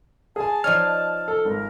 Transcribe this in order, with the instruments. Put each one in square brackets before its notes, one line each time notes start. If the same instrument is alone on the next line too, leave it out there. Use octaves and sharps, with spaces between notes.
[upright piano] G#4 G#5 [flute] A5
[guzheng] F3 D#4 C#5 [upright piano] D5 [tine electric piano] F6
[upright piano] A4
[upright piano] G#1 [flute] A#4